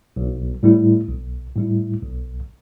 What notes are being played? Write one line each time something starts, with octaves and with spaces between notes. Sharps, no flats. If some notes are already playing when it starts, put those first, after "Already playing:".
B1
A2 G3 E4
B1
A2 G3 E4
B1